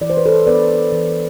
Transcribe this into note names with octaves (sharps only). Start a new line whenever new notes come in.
E3 D5
C5
B4
A4 C5
B3 D4 B4 D5
E3